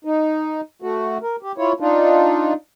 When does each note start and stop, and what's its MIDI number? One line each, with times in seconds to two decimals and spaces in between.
0.05 0.61 63
0.82 1.18 57
0.82 1.18 66
1.23 1.36 70
1.43 1.52 67
1.58 1.72 64
1.58 1.72 65
1.58 1.72 73
1.80 2.53 62
1.80 2.53 63
1.80 2.53 65